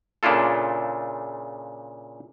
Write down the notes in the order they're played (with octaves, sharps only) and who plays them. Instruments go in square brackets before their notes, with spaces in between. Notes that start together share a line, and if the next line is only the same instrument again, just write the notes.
[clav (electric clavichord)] A#2 C#3 D4 E4 F4 A4